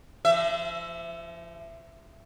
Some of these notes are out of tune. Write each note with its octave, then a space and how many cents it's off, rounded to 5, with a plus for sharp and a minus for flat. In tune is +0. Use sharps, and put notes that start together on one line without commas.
F3 -30 E5 +15